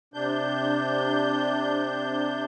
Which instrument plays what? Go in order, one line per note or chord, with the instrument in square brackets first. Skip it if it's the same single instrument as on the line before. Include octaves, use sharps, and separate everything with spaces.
[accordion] C3 D4 G6